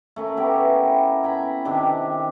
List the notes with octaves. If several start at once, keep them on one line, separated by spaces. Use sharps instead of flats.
A3 C#4 A#4
B3 E4 G4 A#4
G5 G#5 A#5 B5
C3 D#3 D4 G4